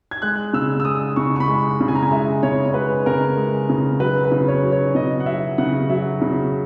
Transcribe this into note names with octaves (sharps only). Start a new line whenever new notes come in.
G#6
G#3 F#6
C#3 E6
E6
G#3 D#6
C#3 C#6
C#6
B5
G#3
C#3
G#5
A#5
G#5
G#3 E5
C#3 C#5
C#5
G#3 B4
C#3 A#4
G#3
C#3
F#3 B4
B4
C#3
C#5
F#3
C#5
C#3 D#5
F#5
F#3 E5
C#3 F#5
F#3 E5
C#3